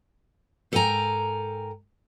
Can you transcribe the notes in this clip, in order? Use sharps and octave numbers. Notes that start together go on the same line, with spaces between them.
G#2 A4 A#4 G5 G#5 A#5